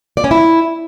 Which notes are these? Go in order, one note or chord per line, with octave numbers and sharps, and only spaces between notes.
D5
C#4
E4